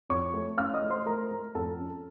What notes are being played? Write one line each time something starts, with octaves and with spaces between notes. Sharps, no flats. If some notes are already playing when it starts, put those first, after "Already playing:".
F2 C#5 C#6
A3
C#4 F5 F6
D#5 D#6
A3
C5 C6
A3 A#4 A#5
A3
F2 A4 A5
C#4